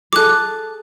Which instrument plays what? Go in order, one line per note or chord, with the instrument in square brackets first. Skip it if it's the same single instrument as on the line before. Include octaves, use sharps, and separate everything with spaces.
[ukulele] G#4 A4 [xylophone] D6 F#6